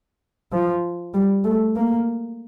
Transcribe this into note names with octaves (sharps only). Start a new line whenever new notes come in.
F3
G3
A3
A#3